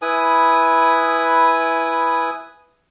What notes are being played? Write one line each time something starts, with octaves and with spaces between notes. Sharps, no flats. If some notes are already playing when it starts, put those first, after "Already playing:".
E4 B4 G#5 D#6